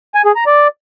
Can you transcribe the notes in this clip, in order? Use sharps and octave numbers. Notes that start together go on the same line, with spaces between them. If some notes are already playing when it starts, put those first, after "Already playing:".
G#5
G#4
A#5
D5